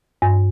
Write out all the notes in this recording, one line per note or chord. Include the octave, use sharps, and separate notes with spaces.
G2